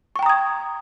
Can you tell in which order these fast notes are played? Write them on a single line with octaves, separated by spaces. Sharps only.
C#6 G5 A#5 D#6 G#6